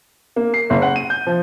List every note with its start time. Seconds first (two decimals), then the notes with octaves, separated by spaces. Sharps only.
0.36 A#3
0.54 C7
0.70 F#1
0.82 F#5
0.96 D#7
1.10 G6
1.27 F3